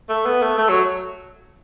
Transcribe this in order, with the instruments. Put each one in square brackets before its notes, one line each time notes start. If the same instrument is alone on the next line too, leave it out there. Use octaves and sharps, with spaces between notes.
[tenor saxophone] A3
B3
A3
A3
F#3